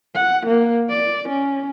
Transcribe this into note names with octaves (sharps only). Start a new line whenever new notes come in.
F#5
A#3
D5
C#4